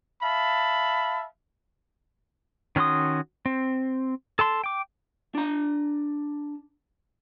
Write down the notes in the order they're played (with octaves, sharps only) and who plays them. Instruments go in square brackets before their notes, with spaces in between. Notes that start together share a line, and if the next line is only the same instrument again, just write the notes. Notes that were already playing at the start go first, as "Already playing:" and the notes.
[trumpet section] E5 F5 A5 B5
[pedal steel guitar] D#3 C#4 F#4 C6 D#6
C4
A4 A5 C6
G5 D6
[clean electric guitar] D4 A#5